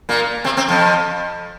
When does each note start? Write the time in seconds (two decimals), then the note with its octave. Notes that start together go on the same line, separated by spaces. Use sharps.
0.09 A#2 A#3
0.44 C3 C4
0.57 C3 C4
0.68 F2 F3